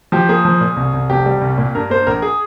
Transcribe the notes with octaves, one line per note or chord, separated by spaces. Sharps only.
F3 G4
A#3 G#4
F3
A#2
C2
C2
F1 G4
G3
C2
A#2
G2 A#4
A#3 C5
A#1 A#4
G#4